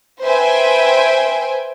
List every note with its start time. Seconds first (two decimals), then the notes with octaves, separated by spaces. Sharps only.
0.22 B4 C5 E5 G5 G#5